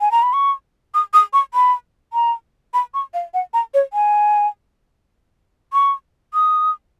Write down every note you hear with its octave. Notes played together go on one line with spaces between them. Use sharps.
G#5
A#5
B5
C#6
D#6
D#6
C#6
B5
A#5
B5
C#6
F5
F#5
A#5
C#5
G#5
C#6
D#6